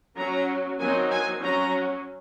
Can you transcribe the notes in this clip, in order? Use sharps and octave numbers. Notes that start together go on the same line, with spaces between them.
F#3 C#4 A#5
D#3 F#3 C4 D#4 G#5
G#5
F#3 C#4 A#5